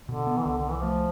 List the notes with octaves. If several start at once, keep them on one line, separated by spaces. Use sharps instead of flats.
B2 D3
B3
E3
C2 D3
D3
C2
E3
F3 A3